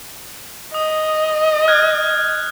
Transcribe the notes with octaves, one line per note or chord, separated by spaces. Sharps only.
D#5 D#6
F6 F#6 G#6